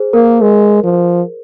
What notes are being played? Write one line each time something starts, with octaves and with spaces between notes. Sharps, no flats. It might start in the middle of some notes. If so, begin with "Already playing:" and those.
Already playing: G#4 C5
A#3 A#4
G#3
F3